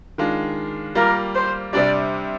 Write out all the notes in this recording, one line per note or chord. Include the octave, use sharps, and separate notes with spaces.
D#3 G#3 D4 F4
G3 A#3 F4 A#4
C5
C3 G3 D4 G4 D5